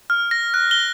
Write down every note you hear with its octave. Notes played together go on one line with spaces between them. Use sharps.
F6
A#6
F#6
G7